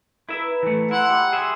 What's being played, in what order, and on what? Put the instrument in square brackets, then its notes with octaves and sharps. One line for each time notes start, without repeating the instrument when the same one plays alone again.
[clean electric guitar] E4 E5 [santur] A#4 B4
[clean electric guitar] E3 A3
[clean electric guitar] E4 [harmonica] F#5 [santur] C6 E6
[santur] G3
[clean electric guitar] G#4 E5 [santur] C6